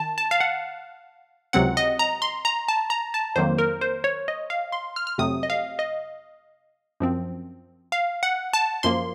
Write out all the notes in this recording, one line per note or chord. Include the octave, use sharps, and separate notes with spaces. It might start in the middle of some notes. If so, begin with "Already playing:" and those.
Already playing: D#3 A5
A5
F5
F#5
C#2 C3 F#3 C4 F#5
D#5
A#5
C6
A#5
A5
A#5
A5
F2 D#3 F#3 A#3 C5
A#4
C5
C#5
D#5
F5
C6
F6
F6
F2 C3 F#3 A3 C4 D#6
D#5
F5
D#5
F#2 F3 C4
F5
F#5
A5
F#2 F3 A#3 C6